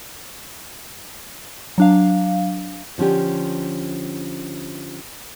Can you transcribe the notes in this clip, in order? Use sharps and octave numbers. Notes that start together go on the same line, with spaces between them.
F#3 D4 F5
D3 F3 C#4 G4